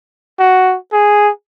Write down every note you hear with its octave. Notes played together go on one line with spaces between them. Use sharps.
F#4
G#4